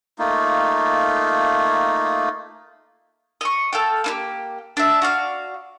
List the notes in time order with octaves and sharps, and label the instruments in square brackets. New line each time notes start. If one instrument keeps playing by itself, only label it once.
[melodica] A3 A#3 D#4 F4
[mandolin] D#5 C#6
A4 F5 G5
A#3 D#4 G4
D4 E5
F#4 D5 F5